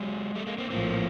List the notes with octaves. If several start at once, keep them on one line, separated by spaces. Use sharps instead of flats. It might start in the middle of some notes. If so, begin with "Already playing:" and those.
Already playing: F#3 G#3
G3 A3
G#3 A#3
A#3 C4
A#1 A2 F3 A#3 C4